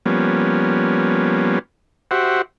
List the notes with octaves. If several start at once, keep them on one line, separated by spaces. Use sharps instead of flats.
F3 G3 A#3 B3 C#4
F#4 G4 C5 E5 F#5